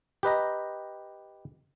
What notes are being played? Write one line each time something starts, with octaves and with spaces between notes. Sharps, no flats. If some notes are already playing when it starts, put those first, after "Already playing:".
G4 B4 D#5 A#5